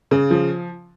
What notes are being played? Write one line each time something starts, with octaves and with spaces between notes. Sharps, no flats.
C#3
F3